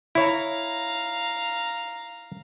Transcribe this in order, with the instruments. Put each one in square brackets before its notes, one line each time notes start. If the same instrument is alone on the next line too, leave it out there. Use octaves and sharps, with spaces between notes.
[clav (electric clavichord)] E4 C#5 [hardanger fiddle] F5 A#5